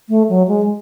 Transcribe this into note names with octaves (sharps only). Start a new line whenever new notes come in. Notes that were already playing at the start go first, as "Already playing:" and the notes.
A3
F#3
G#3